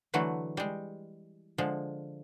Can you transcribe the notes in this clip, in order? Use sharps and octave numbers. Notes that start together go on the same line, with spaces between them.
D3 E3 F#3 A3 B4
G3 G#3
D3 F3 G#3